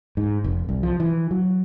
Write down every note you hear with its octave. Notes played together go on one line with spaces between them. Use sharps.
G#2
F1
C2
F3
E3
F#3